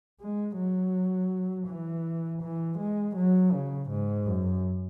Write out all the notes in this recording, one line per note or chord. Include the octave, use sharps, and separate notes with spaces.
G#3
F#3
E3
E3
G#3
F#3
C#3
G#2
F#2